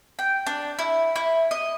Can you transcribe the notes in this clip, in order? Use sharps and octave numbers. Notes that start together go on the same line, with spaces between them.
G5
D4
E4
E4
D#5